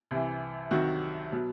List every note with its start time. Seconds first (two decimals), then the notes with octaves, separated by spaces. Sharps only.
0.11 C2 C3 E3
0.71 C2 C3 D#3 F#3 F#4
1.32 B2 F#3